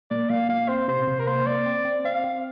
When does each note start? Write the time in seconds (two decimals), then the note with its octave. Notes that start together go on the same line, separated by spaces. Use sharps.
0.11 A#2 D5
0.30 A#2 F5
0.49 A#2 F5
0.68 C4 C5
0.88 C3 C5
1.07 C3
1.19 A#4
1.27 A#3 C5
1.47 A#3 D5
1.66 C4
1.85 C4
2.04 C4 F5
2.24 C4